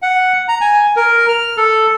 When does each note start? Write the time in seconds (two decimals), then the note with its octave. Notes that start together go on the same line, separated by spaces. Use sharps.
0.02 F#5
0.48 A#5
0.61 G#5
0.96 A#4
1.29 F6
1.57 A4